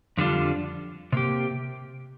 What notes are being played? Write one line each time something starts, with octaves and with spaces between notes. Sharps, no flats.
F2 D3 G3 D4 F4
C3 A#3 G4